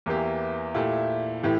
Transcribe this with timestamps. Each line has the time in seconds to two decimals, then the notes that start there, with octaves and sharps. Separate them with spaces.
0.06 E2 E3 A#3 E4 G4
0.75 A#2 A3 E4 G4
1.43 A2 E3 A3 E4 G4